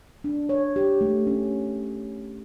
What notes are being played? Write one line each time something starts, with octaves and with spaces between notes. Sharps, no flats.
D4
C#5
G4
A3
C#4